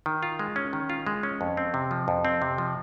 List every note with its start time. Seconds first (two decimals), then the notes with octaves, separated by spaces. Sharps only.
0.06 D#3
0.23 F4
0.39 G#3
0.56 C#4
0.73 D#3
0.90 F4
1.07 G#3
1.23 C#4
1.41 F2
1.57 C4
1.74 C3
1.91 F3
2.08 F2
2.25 C4
2.42 C3
2.58 F3